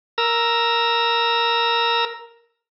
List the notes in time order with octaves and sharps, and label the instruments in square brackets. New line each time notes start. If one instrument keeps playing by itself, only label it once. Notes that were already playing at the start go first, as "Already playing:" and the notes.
[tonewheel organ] A#4 A#5 E6